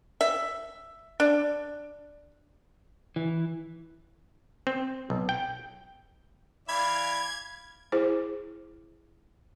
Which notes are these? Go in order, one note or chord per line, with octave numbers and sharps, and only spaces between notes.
E5
D4
E3
C4
B1
G5
E3 D5 F5 B5 G#6
E4 G#4 C5